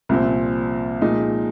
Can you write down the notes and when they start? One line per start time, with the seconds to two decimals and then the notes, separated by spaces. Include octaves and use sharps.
0.09 C2 A#2 F3 C4
1.02 A#2 F3 G#3 D#4